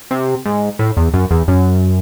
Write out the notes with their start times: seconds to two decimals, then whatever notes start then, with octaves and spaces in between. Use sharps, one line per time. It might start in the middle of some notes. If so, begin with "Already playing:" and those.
0.11 C3
0.45 G#2
0.79 A2
0.97 E2
1.14 F#2
1.31 E2
1.48 F#2